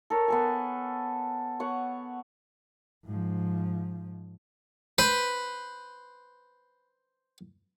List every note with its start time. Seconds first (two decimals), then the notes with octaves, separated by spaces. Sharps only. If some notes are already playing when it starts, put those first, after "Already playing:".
0.10 A4 A#4 C#5
0.28 B3 A4 G#5
1.60 B3 C#5 F#5
3.05 G#2 F3
4.98 B4 C5